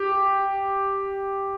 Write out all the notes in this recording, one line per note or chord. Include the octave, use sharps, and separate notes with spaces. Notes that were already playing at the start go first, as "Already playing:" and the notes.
Already playing: G4